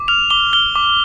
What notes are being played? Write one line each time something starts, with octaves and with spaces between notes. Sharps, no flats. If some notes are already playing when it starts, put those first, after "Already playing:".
Already playing: D6
F6 F7
D6 G7
F6 G7
D6